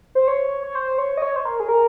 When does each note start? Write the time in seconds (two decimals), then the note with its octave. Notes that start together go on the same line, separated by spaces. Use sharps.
0.15 C5
0.28 C#5
0.63 C#5
0.75 C5
0.98 C#5
1.17 D#5
1.22 C#5
1.36 C5
1.45 A#4
1.60 G#4
1.68 A#4